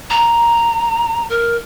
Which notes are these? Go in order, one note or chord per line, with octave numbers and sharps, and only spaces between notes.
A#5
A#4